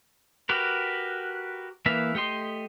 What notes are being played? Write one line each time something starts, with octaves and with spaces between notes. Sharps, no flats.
F#4 G4 A#4 B4
E3 A#3 B4 E5 F5
A3 G4 D#5 C6